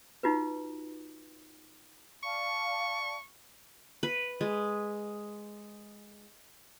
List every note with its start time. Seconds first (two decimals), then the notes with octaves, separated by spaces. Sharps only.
0.23 D#4 F4 F#4 B4
2.23 D5 F5 A5 C#6
4.03 B4
4.41 G#3